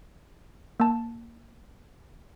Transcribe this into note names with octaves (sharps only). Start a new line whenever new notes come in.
A#3 A5